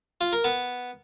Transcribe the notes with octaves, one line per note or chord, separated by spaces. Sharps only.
F4
A#4
B3